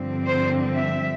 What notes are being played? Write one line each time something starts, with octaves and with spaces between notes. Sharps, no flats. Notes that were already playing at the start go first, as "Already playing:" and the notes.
Already playing: G2 D3 F3 C4
C5
E5